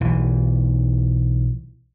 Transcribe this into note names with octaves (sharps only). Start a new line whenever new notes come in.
B1 E3